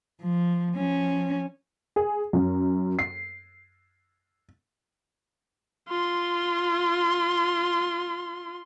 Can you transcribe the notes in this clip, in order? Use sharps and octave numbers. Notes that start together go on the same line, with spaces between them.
F3
F3 C#4
G#4
F#2
C7
F4 C6